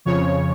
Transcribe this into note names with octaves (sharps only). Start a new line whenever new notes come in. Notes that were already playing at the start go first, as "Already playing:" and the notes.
F2 C#3 F3 C#5